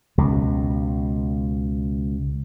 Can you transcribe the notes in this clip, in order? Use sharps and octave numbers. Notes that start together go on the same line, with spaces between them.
C#2 B2